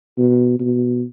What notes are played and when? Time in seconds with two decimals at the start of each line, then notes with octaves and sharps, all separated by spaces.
0.18 B2
0.60 B2